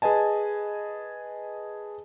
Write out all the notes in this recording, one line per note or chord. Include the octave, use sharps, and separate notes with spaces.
G#4 B4 D#5 G#5 A5